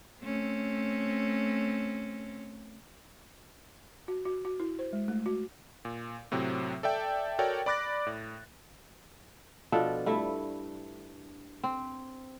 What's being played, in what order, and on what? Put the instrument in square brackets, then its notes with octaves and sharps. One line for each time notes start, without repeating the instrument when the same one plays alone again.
[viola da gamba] A3 C4 C#4
[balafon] F#4
F#4
F#4
E4
C5
G#3
A3
F#4
[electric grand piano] A#2
A2 C3 F#3 C4
A4 D5 E5 G5 A5
F#4 A4 A#4 C#5 D5 G5
D5 B5 D6 F#6 A6 A#6
A2
[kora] B2 F3 D4 A4
G2 A3 E4
C4